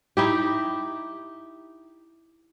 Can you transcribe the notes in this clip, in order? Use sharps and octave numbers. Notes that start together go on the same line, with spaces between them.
D#4 E4 G4